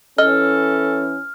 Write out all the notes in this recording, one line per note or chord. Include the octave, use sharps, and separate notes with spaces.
E3 C#4 A4 D#5 F6